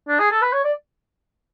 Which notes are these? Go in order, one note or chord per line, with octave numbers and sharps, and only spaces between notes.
D4
G#4
A4
B4
C#5
D5